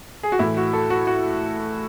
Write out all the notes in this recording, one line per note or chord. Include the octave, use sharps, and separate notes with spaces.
G#4
F#4
A2 E3 E4
F#4
A4
F#4
F#4